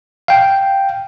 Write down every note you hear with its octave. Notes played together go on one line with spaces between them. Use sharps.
F5 G5